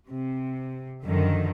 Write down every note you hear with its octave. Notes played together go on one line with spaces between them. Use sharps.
C3
F#2 D3 D#3 F3